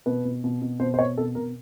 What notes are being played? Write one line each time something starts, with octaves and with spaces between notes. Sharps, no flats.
B2 B4
B2
B2
B2
B2 C5
C5
B2 C#5
B2 A4
B2 A#4